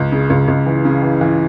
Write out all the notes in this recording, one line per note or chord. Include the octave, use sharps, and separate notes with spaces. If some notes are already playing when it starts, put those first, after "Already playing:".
Already playing: C#2
C#3
C#2
C#2
E3
C#3
E3
E3